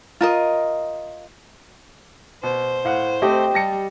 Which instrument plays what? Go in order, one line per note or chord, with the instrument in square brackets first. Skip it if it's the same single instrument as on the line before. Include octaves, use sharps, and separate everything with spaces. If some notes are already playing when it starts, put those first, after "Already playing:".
[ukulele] F4 A#4 D#5
[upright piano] B2 [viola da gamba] C5
[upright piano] A2 F5 F#5
[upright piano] A3 C4 [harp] G4 D#5 G5
[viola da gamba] G3 [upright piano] A5 A#6 C#7